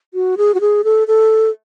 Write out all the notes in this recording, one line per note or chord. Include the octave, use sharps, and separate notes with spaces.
F#4
G#4
F#4
G#4
A4
A4